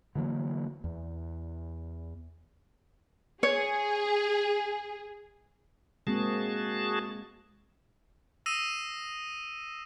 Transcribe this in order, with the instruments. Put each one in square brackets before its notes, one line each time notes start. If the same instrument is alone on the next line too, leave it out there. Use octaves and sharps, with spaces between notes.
[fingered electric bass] D3 E3 F#3 A#3
E2
[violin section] G#4 [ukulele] C#5
[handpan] G#3 A#3 C4 [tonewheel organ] F#4 G#4 A5
[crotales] D#6 E6 A#6 C7 D#7 E7